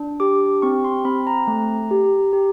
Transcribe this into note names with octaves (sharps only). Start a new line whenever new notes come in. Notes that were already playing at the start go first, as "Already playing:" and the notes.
Already playing: D4
G4 D6
C4 C#6
C6
C4 B5
A#5
A3
G4
G4